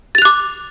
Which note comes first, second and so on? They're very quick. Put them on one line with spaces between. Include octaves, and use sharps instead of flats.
A6 F7 F#6 D6